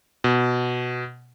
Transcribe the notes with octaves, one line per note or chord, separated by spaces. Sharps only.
B2